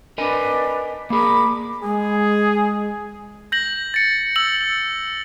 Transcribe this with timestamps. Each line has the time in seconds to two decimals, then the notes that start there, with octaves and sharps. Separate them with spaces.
0.18 D4 A#4 B4 D#5 G#5
1.10 A#3 G#4 A#4 B5 D6
1.83 G#3 G#4
3.52 G6 A#6 F#7
3.94 A6 C#7
4.36 E6 C#7 F#7